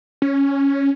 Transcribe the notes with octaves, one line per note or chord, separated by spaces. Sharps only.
C#4